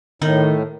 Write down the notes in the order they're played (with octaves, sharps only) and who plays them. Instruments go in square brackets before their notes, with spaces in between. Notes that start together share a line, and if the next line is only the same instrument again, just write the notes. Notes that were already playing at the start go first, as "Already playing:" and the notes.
[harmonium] A2 [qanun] D#3 D#4